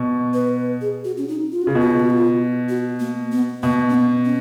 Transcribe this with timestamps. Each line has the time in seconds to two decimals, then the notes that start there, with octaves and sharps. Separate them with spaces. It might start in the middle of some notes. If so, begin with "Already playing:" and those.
Already playing: B2
0.34 B4
0.81 G#4
1.05 F#4
1.17 C#4
1.28 D#4
1.52 F4
1.62 F#4
1.67 C#3
1.70 B2 F4
1.81 F#4
1.91 F4
2.00 F#4
2.10 F4
2.69 F#4
3.00 A#3
3.32 B3
3.63 B2 A#3
3.90 C#4
3.94 B3
4.25 C#4